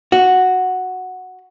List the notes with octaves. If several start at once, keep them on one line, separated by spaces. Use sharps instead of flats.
F#4